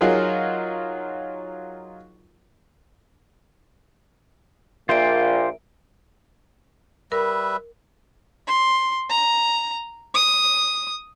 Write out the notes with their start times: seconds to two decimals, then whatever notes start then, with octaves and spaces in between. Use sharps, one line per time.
0.01 F#3 D#4 F4 F#4 G#4 A#4
4.89 A#1 A#2 F4 A#4 C5 E5 D7
7.12 G3 A#4 B4 E5
8.47 C6
9.10 A#5
10.14 D#6